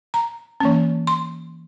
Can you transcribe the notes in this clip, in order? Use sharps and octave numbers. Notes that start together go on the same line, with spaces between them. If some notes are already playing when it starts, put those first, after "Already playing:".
A#5
E3 A#3 C#4
C6